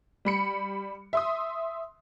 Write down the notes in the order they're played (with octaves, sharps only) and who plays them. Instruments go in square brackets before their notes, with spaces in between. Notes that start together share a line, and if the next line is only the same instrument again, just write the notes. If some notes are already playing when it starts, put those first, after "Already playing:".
[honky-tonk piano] G3 B5 C#7
E5 C6 D#6